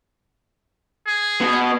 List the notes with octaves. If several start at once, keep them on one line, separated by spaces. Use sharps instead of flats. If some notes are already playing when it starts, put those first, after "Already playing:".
G#4
B2 B3